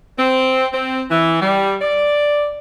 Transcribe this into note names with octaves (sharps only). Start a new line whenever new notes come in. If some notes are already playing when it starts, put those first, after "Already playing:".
C4
C4
E3
G3
D5